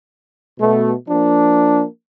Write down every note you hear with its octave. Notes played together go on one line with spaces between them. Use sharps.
B2 A3
F3 A#3 D4